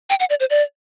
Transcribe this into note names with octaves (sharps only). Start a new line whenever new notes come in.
G5
F#5
D5
C5
D5